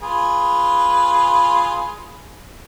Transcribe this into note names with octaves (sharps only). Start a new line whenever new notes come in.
F4 G#4 B4